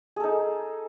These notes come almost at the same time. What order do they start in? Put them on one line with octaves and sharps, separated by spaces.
G#4 A4 D#4